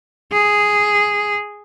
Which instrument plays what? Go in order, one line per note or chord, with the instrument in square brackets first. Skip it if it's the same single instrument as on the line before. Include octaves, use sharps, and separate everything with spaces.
[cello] G#4